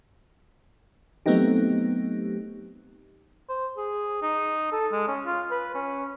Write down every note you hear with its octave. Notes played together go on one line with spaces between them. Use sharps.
F#3 A3 B3 C4 D#4 G4
C5
G#4
D#4
A4
G#3
C#4
F4
B4
C#4